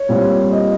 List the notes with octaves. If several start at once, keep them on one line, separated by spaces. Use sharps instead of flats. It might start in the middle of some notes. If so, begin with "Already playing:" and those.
Already playing: C#5
A#2 G3 C4 F4
D#5